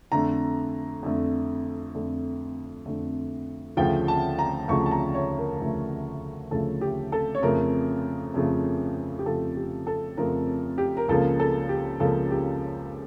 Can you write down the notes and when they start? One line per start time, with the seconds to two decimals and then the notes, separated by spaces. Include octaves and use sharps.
0.12 F2 D3 A3 A#5
1.03 F2 D3 A3
1.94 F2 D3 A3
2.86 F2 D3 A3
3.77 D2 C#3 F3 A3 G5
4.08 A5
4.39 A#5
4.68 D2 C#3 F3 A3 C#6
4.86 A5
4.91 A#5
5.15 C#5
5.38 A#4
5.60 D2 C#3 F3 A3
6.51 D2 C#3 F3 A3 A4
6.81 G4
7.12 A4
7.35 C#5
7.42 F2 C#3 F3 A3 A#4
8.34 F2 C#3 F3 A3
9.19 G4
9.26 F2 C#3 F3 A3 A4
9.56 G4
9.87 A4
10.17 F2 C#3 F3 A3 A#4
10.78 G4
10.97 A#4
11.08 C#2 C#3 F3 A#3 A4
11.40 A4
11.69 G4
12.00 C#2 C#3 F3 A#3 A4
12.31 G4